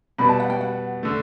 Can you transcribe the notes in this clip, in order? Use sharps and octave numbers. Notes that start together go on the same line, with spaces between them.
B2 G3 B3 B5
A5
F#5
G5
F#5
D3 A3